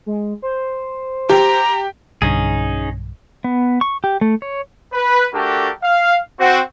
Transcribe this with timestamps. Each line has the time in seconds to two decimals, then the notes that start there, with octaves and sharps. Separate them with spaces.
0.06 G#3
0.42 C5
1.29 G4 A#5
2.22 B1 G2 D3 C#4 D#4 G#4
3.44 B3
3.81 C#6
4.04 G4
4.21 A3
4.42 C#5
4.93 B4
5.33 A3 D4 F#4 G4 A4 A#4
5.82 F5
6.39 C4 F#4